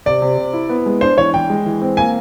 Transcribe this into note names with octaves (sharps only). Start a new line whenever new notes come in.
C3 D5
C3
C3
E4
B3
G#3
D4 C5
E3 C#5
E3 G5
G#3
E3
C4
A#3 G#5